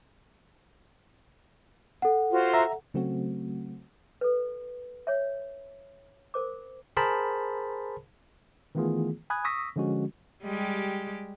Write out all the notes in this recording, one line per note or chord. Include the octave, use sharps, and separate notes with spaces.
A4 F#5
F4 F#4 C5
E5 A#5
C#3 F#3 A3 C4 F#4
A4 B4
C#5 E5
A#4 C5 D6
G#4 A#4 C5 A5 B5
D#3 E3 A3 B3 F4 G#4
G#5 B5 D#6 F#6 G#6
C#6 D#6 E6 A#6 B6
D3 F3 G#3 C#4 F#4
G3 G#3 G4